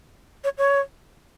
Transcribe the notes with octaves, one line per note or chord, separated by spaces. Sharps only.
C#5
C#5